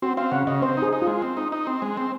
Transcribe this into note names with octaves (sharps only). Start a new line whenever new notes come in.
C4 F#4
C4 F5
C#3 F#5
C#3 D#5
C4 C5
D#4
G#4
D#4
F4
G#3
C4
D#4
D#4
C4
G#3
C4